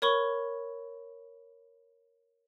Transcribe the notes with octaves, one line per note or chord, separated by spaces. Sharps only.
A#4 C#5 B5 C#6 G7